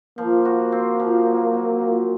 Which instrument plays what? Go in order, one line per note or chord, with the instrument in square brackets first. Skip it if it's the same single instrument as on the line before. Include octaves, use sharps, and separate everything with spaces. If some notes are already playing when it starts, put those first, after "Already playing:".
[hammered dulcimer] F3 [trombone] A#3
[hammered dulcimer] F#4
C4
F3
F#3
F#3
A#2